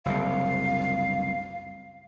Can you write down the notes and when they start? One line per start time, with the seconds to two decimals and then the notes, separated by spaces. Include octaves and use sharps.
0.06 F#1 C2 F5